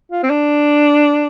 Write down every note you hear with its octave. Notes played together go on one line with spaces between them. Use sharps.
F4
C4
D4